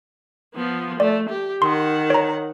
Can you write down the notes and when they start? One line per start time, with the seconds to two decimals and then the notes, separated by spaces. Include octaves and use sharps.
0.55 F3 B3
1.00 A3 D5
1.29 G4
1.62 D#3 F#5 C6
2.10 C#5 A#5